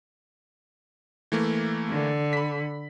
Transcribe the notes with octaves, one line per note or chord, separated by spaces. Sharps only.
E3 A3 A#3
D3
B5 B6